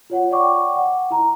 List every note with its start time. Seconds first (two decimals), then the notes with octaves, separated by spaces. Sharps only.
0.10 F4 C#5 F#5
0.31 D5 F#5 G5 C#6 D6
0.76 F#5
1.10 E4 A#5